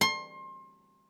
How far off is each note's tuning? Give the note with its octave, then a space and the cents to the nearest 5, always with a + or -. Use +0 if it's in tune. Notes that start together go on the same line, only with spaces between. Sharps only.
C6 +30